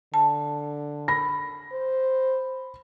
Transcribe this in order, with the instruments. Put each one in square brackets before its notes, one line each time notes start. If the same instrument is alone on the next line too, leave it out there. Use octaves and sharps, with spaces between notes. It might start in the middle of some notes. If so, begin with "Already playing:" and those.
[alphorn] D3 [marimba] A5
[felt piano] B5 A#6
[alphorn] C5